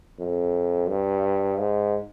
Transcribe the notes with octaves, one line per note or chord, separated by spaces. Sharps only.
F2
G2
G#2